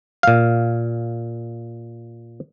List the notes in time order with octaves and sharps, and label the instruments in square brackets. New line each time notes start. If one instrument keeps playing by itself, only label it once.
[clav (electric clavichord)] A#2 F5